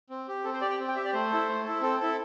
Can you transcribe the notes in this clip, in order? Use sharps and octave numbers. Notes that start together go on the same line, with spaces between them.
C4
G4
C4 A4
C5
G4 D5
G5
C4
G5
G4 E5
D5
A3 C5
E4 A4
A3
E4 A4
C4 A4
E4 A4